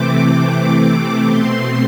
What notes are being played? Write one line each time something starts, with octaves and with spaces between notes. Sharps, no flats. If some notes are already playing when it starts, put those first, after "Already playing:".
Already playing: C3 E3 A3 C4 D6
B2 A3 C4 C6